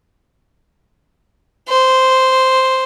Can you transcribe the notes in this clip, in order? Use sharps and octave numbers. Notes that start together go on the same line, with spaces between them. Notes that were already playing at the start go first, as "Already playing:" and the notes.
C5